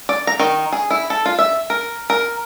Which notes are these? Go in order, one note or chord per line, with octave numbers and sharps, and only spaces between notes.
D5
A#5
D#3
G#4
E4
A4
F4
E5
A#4
A#4